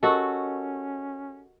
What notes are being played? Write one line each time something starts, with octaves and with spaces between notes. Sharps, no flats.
C#4 F#4 G4 A4 A#4 D#5